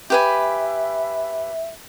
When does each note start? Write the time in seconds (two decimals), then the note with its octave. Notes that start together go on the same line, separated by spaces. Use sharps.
0.10 G4 B4 E5 G#5